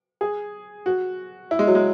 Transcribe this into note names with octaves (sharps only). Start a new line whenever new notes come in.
G#4
F#4
E4
G#3
F#3
G#3